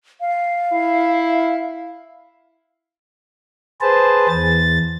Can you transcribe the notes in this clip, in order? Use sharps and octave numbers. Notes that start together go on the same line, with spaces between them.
F5
E4
G#4 B4 C5 A5
E2 A6